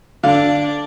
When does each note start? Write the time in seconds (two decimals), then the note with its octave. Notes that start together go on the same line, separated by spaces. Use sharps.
0.23 D3 D4 D5 F5